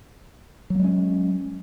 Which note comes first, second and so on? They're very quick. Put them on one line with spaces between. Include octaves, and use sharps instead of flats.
F#3 A#3 G#3 C#4